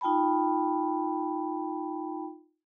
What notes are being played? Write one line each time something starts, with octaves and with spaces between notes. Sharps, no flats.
D#4 F4 G5 A5 B5